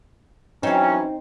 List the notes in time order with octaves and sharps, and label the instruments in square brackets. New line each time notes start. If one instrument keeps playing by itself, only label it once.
[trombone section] E3 F#3 C#4 [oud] C4 D#4